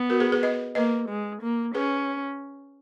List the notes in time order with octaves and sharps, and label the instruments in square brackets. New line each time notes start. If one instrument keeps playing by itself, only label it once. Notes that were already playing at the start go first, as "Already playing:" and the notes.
Already playing: [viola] B3
[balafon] F#4 A#4
G#4 B4
G#4 B4
B4 D#5
[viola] A#3 [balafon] B4 D#5
[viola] G#3
A#3
[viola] C#4 [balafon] G#4 B4